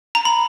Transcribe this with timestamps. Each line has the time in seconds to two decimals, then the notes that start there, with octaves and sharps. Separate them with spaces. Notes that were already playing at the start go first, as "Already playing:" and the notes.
0.15 A#5
0.25 B5